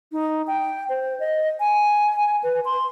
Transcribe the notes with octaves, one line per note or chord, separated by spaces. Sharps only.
D#4
G5
C5
D#5
G#5
B4
C6